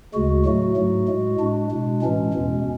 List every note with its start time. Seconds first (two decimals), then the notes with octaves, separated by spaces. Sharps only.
0.14 D2 C#3 G#3 F#4
0.45 A2 F#3 A3 F#4
0.77 G#2 F#3 A3
1.08 A2 G#3
1.40 A2 G#3 D4
1.71 B2 G#3
2.02 A2 E3 G#3 C#4
2.33 E2 B2 G#3